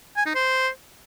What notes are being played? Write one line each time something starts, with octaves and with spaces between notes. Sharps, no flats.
G#5
D#4
C5